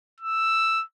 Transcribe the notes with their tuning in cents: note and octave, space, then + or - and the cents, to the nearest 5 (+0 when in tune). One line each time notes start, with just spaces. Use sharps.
E6 +5